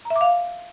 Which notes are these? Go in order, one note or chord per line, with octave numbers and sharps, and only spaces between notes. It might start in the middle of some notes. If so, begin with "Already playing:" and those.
A#5
E5
D6
F5